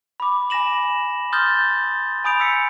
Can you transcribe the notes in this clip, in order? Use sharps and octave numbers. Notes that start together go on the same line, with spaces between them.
B5 D6
G#5 B5 A#6 E7 F#7
C6 D#6 F6 G6 A6 G7
G#5 B5 D#6 G6 D7 F7
D#6 E6 B6 C#7